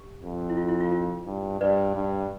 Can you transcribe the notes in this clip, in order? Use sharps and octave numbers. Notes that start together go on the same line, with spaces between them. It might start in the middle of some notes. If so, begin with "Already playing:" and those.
Already playing: G4
F2
E4
F4
E4
F4
F4
G2
G2 B4 D5
G2